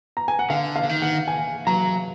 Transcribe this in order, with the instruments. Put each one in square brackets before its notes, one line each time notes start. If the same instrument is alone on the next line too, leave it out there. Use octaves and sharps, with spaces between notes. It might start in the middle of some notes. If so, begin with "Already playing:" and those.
[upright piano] A#5
G#5
F#5
[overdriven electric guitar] D3 [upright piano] F5
[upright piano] F5
[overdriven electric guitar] D3
D#3
[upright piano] F#5
G#5
[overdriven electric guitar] F#3 [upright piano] A#5